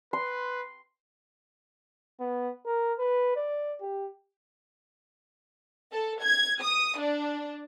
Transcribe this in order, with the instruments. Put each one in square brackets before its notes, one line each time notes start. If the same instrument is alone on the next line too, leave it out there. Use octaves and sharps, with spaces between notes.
[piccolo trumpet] B4 [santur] C6
[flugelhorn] B3
A#4
B4
D5
G4
[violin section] A4
G#6
D#6
D4